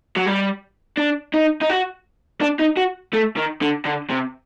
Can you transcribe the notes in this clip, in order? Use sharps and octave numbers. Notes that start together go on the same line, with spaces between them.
F#3
G3
D4
D#4
D#4
F#4
D4
D#4
F#4
A3
D#3
D3
D3
C3